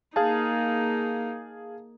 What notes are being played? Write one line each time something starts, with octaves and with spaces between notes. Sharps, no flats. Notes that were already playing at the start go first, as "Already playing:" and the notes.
A#3 D#4 G#4 F5 A5